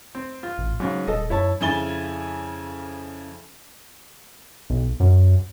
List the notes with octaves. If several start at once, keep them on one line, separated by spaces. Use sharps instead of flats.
C4
F4
A1
G#2 C#3 F#3
D#1 A4 D#5
F#2 E4 C#5 A5
F2 C#3 E4 G#5 A6 G7
B1
F#2